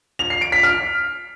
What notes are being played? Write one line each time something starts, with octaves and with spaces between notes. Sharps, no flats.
F7
C7
D7
B6
F6